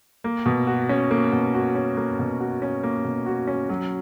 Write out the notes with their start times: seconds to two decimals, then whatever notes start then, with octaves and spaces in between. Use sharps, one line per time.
0.24 A#3
0.46 B2
0.67 F#4
0.89 C#4
1.11 A#3
1.33 B2
1.54 F#4
1.75 C#4
1.97 A#3
2.19 B2
2.40 F#4
2.62 C#4
2.83 A#3
3.04 B2
3.26 F#4
3.47 C#4
3.69 F#3